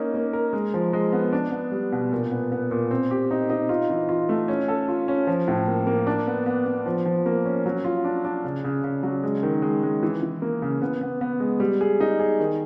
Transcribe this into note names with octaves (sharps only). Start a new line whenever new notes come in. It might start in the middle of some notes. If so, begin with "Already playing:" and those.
Already playing: A#3 C#4 D#4
A#3
A#4
G#3
F3
G#3
B3
D4
B3
G3
B2
A#2
B3
B3
A#2
C4
G4
D#4
D#4
F4
E3
F4
A3
C#4
A4
F4
C#4
F3
A2
A#3
A#3
D4
B3
B3
B3
F3
F3
A#3
C#4
F#3
F4
D4
D4
C#3
C#3
C#3
F#3
G#3
D#3
G#3
G#3
E3
E3
A#3
C#3
B3
B3
B3
G#3
G3
G#4
D#4
G#4
D#3